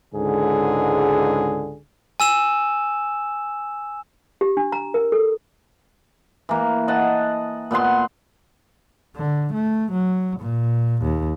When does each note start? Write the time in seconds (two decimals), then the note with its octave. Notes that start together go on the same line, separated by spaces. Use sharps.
0.13 C#2 G#2 D3 G#4
2.20 G#5 E6 E7
4.41 G4
4.57 D4
4.72 A#5
4.94 A#4
5.12 A4
6.49 E3 A#3
6.88 D#5 F#5 A5
7.71 A#2 B3 F#5 C6
9.16 D3
9.53 A3
9.92 F#3
10.40 A#2
11.03 D#2